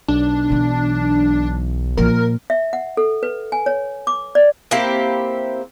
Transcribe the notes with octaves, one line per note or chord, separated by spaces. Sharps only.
B1 D4
B2 E3
A#2 F3 A#4
E5
F#5
A4
B4
G#5
C#5
D6
D5
A#3 C4 E4 G4